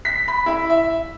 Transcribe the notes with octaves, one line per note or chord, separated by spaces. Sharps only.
B6
B5
E4
E5